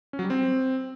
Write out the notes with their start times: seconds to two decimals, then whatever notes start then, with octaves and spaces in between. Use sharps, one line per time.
0.13 C#4
0.19 F#3
0.24 G3
0.30 C4